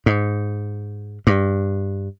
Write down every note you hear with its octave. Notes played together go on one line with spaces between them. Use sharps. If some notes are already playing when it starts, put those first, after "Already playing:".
G#2
G2